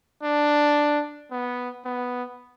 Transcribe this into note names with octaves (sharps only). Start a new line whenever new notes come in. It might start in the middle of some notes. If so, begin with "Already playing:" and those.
D4
B3
B3